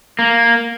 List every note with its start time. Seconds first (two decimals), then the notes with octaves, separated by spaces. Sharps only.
0.19 A#3